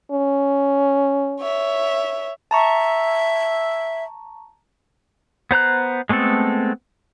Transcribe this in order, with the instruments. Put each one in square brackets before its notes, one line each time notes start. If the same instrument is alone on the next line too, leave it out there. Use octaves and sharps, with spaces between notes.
[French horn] C#4
[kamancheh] C#5 E5
[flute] E5 [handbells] A5 A#5 C#6
[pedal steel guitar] B3 C5 A#5 F#6
G#3 A3 B3 C4 A4